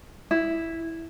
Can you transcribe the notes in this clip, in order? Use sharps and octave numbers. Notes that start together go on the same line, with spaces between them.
E4